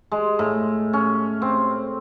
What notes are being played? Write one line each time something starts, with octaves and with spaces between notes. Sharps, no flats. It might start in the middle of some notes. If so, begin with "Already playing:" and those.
G#3
A2
C#4
C4